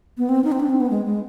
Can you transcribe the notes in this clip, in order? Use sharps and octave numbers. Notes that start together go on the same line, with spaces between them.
B3
C4
D#4
C4
D4
C4
B3
G#3
G#3